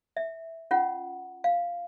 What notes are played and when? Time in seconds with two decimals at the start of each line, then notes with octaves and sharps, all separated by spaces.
0.17 E5
0.71 C#4 F4 F#5
1.44 F5